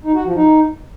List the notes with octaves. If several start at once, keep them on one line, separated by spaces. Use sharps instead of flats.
D#4
F#4
F3
D#4